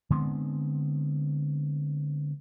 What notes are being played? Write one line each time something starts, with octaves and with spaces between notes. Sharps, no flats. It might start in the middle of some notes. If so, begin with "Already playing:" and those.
D3 G#3 B3 C4